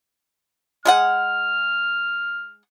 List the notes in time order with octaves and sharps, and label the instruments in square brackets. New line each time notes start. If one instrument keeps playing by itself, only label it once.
[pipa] G#3 G#4 F#5 [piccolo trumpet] F6